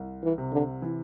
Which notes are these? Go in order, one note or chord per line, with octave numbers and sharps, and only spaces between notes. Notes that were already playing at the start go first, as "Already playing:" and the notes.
Already playing: C2
E3
C3
D3
E3